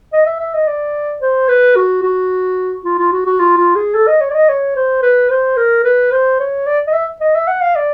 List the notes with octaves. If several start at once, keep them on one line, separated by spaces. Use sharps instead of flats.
D#5
E5
E5
D#5
D5
C5
B4
F#4
F#4
F4
F4
F#4
F#4
F4
F4
G#4
A4
D#5
C#5
D5
D#5
C#5
C5
B4
C5
A#4
B4
C5
C#5
D5
D#5
E5
D#5
E5
F#5
F5
D5